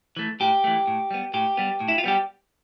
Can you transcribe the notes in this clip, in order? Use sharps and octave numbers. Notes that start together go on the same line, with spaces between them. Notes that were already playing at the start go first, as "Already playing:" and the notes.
E3 A3
A2 G4
E3 A3
A2
G3 B3
A2 G4
G3 B3
A2
E4
F4
G3 B3 G4